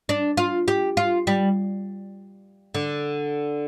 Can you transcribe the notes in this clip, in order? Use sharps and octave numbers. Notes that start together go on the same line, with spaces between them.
D4
F4
G4
F4
G3
D3